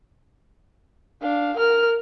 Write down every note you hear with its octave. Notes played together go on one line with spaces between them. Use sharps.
D4 F5
A#4 F6